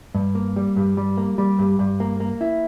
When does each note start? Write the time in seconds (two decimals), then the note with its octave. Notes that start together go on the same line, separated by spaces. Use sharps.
0.15 G2
0.35 A#3
0.56 G3
0.76 G2
0.97 G3
1.18 A#3
1.38 G3
1.59 G2
1.79 G2
2.00 A#3
2.20 A#3
2.41 E4